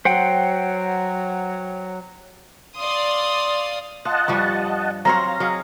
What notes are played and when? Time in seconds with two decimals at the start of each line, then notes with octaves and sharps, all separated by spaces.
0.05 F#3 C5 F#5 G5
2.76 D5 F5 C6 D#6
4.05 F4 D#5 F#5 A5
4.28 G2 F3 G3 C#6
5.05 F#3 C4 C#5 F5 A#5 C6
5.40 F#3 D#4 G#4